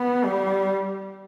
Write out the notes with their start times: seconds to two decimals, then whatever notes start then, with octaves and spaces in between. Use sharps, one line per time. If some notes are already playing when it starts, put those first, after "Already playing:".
Already playing: B3
0.25 G3